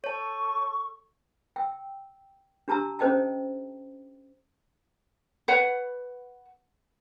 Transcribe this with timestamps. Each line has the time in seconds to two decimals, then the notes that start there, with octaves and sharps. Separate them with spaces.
0.04 A4 C#5 A5 C#6
1.56 G5 E6
2.68 D4 G4 A5 A#5 E6
2.99 C#4 A4 C5 D#5 G5 A5
5.48 B4 C#5 F#5